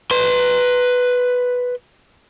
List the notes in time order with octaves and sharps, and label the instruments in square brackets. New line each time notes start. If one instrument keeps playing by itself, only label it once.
[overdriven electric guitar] B4 C6